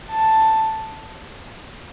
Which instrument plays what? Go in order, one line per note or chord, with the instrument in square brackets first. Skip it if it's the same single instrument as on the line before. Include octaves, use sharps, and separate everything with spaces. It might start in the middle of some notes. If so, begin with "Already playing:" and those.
[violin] A5